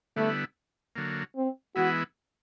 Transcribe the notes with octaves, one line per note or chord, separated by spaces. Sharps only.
D3 G3 A3 B3 E4
D3 F#3 A#3
C4
E3 G#3 B3 E4 F#4